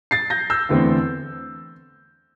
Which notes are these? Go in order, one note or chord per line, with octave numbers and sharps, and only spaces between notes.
A6 C7
G6 A#6
E6 G6
E2 D3 A3 C4